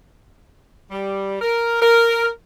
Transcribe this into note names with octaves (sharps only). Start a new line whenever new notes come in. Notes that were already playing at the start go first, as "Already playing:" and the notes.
G3
A#4
A#4